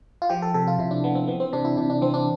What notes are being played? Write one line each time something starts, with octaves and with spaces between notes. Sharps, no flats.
F4
F3 G4
A4
C3 A4
F4
C3 E4
D4
F3 B3
C4
E3 B3
C4
C3 D4
E4
C3 D4
D4
E3 C4
D4